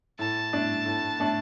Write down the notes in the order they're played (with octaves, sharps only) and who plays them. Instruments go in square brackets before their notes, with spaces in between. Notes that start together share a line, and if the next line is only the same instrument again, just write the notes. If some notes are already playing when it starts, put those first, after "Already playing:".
[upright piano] A2 [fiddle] A5
[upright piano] A3 D4
A2
A3 D4